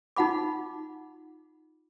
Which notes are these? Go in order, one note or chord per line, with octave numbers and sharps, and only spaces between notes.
D#4 F4 F#5 B5 D6